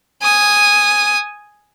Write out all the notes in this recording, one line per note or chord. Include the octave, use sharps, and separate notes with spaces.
G#5 D#6